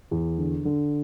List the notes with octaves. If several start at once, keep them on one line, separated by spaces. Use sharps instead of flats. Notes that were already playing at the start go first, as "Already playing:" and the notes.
E2
D3
D3